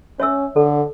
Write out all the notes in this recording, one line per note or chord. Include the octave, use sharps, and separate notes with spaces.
C#4 C#5 E5 E6
D3 A4